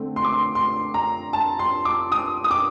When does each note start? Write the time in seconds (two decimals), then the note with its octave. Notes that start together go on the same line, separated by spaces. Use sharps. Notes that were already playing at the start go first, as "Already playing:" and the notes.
Already playing: D3 A3 C4
0.16 C6
0.24 D6
0.32 C6
0.55 C6
0.94 A#5
1.33 A5
1.59 C6
1.85 D6
2.12 D#6
2.44 D#6
2.51 D6